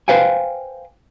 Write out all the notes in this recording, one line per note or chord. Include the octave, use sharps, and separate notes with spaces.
B4 C5 F5 G5 G#5